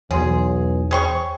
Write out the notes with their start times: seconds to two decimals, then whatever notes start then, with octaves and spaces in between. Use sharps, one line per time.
0.11 B1 E2 G#4 C#5 C6
0.91 G#4 C5 C#5 G5 C6 C#6